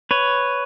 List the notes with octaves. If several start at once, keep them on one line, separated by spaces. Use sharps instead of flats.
B4 C#5